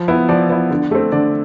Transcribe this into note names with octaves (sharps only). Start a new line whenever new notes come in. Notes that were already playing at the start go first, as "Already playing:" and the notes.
Already playing: F3
B3 E4
F3 D5
B3 E4
D3
A3 C4
D3 D5